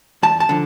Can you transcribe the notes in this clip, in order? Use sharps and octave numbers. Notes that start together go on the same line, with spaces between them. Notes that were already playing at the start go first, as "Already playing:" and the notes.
E2 A5
A5
D3 F3